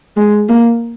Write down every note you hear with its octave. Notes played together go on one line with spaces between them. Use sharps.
G#3
A#3